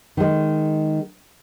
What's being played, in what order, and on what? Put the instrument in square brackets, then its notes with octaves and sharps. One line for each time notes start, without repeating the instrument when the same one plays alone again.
[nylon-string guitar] D#3 G#3